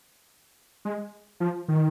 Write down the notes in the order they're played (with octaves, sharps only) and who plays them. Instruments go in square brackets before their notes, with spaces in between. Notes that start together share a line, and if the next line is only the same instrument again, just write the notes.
[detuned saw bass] G#3
F3
D#3